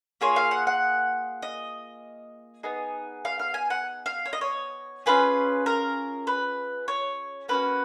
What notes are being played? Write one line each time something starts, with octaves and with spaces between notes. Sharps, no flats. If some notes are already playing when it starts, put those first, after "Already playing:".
A#3 F4 G#4 C#5
F5
F#5
F#5
D#5
B3 D#4 G#4
F5
F5
G#5
F#5
F5
C#5
D#5
C#5
C#4 F4 G#4 B4
A#4
B4
C#5
A#3 C#4 F#4 B4